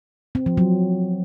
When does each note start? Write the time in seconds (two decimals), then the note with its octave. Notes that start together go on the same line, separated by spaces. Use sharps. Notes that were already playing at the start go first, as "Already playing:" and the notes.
0.35 C4
0.46 F3
0.57 F#3